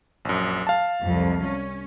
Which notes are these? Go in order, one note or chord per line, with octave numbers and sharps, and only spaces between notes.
A#1 F#2
F5 A5
C2 F2
C#4